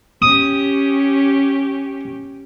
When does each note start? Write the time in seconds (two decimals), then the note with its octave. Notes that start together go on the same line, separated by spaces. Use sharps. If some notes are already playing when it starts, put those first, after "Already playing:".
0.22 C#4 G4 D#6